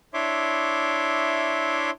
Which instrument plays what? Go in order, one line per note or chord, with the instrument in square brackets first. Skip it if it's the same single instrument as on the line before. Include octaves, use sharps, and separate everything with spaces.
[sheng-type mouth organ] D4 E4 C#5 E5 C6 D6